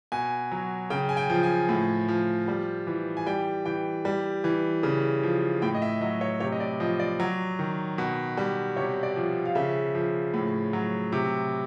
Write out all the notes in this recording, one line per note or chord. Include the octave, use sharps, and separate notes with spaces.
B2 G#5
F#3
C#3 G5
G#5
G5
F3
G#5
A2
F3
G3
E3
G#5
G3 G5
E3 G5
G3
E3
C#3
F3
A2 G5
D#5
E5
F#3 D#5
C#5
C3 C#5
D#5
D5
F3 D#5
D5
F#3
D#3
B2
G3
C3 C#5
D5
F3
F5
C#3 E5
F3
A2
F#3
C3